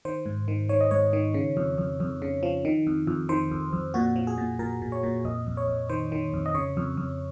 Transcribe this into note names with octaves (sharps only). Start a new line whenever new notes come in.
D#3 C5
G#2
D#3
D#3 C#5
D#5
G#2 C#5
D#3
C#3
F2
F2
F2
C#3
F3
D#3
F2
F2
D#3 C5
F2
F2
A#2 F#4
F3
G#4
A#2
A#2 A#4
A#2
C#5
A#2
F2 D#5
F2
C#5
F2
D#3 C5
D#3
F2
D#5
C#3 C#5
F2
F2